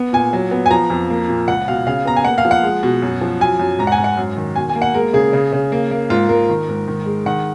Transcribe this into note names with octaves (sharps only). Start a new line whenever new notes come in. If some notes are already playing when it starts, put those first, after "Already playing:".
Already playing: B3
A#2 G#5
F#3
B3
G#5
F3 A#5
F2
A#3
A#2
C#2 F#5
B2 F5
C#3 F5
B3 A#5
G#5
A#3 F#5
F5
F3
F#5
G#3
B2
F#2
F3
F#2 G#5
F#2
G#2 A#5
F#5
G#5
G#2
F#5
F#2
D#3
B2 G#5
G#5
A#3
F#5
G#3 A#4
C#3 G#4
C#3
C#3
A#3
A#3
G#2 F4
G#2 A#4
D#3
G#2
D#3
G#3
D#3 F#5